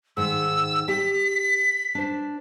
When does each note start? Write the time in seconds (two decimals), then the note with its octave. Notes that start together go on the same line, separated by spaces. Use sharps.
0.17 G#2 D#3 E6
0.88 G4 G5 B6
1.95 D4 C5